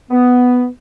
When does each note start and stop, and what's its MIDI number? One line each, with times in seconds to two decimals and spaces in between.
0.11 0.66 59